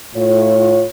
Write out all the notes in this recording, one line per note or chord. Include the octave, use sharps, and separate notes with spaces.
A2 F4 C#5